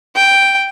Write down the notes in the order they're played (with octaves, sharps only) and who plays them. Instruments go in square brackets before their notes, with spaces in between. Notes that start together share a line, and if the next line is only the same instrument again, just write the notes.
[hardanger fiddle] G5